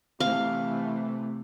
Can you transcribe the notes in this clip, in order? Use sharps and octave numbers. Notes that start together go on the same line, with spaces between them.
C3 E3 A3 F5